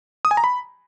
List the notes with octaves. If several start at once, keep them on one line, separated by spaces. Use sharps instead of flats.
D#6
G#5
A#5
B5